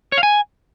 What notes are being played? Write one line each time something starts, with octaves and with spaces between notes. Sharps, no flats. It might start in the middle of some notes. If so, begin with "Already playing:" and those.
C#5
F5
G#5